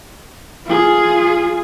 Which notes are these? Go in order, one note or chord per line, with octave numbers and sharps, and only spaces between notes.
F4 G#4